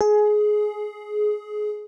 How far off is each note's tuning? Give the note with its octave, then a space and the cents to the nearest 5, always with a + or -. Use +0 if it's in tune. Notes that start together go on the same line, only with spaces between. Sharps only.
G#4 +20